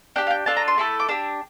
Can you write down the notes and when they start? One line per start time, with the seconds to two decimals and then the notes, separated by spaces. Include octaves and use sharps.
0.16 D4 G4 G5
0.27 F5
0.31 G5
0.46 D4 F4 A4 A5
0.57 A#5
0.68 C6
0.78 A3 E4 A4
1.00 D6
1.09 D4 G4 E6